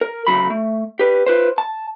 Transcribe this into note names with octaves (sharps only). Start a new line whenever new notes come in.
A#4
D2 C#3 F#3 B5
A3
G4 B4
F4 B4 C5
A5